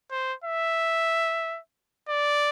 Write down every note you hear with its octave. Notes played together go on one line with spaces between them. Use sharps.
C5
E5
D5